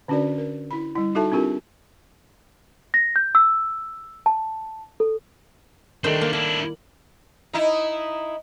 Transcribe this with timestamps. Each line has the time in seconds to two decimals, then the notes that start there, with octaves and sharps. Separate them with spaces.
0.08 D3 C#4 D4 F#4 A#4 D5
0.38 A#4
0.71 E4 B5
0.96 G3 E4
1.15 D#4 F#4 A4 E5 A5
1.32 C4 D4 F4 G4 A#4
2.94 A#6
3.16 G6
3.35 E6
4.26 A5
5.00 A4
6.04 D#3 G3 A3 D4 C5
6.21 A#3
6.33 A#3 D4 E4
7.53 D#4 E4